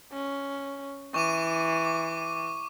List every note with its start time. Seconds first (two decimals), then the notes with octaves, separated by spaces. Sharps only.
0.12 C#4
1.14 E3 C#6 D6 D#7
1.85 D6